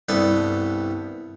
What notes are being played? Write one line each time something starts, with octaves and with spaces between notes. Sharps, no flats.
C2 G2 B3 A4